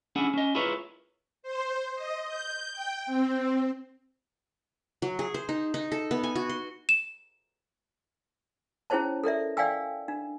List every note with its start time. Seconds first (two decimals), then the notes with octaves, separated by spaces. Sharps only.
0.16 C#4 D4 E4 G#4 F#5
0.34 C#4 D#5
0.55 E4 F4 G#4 A#4 B4 C#5
1.43 C5
1.95 D#5
2.27 G6
2.72 G5
3.06 C4
5.02 F#3
5.19 G#4
5.34 C5
5.49 D#4
5.74 D#4
5.92 A4
6.11 B3
6.23 G#5
6.35 F#4
6.49 C6
6.89 E7
8.90 C#4 E4 G#4 C5 C#5 A5
9.24 A4 A#4 D5 E5
9.57 D5 F5 G5 G#5 E6
10.08 D4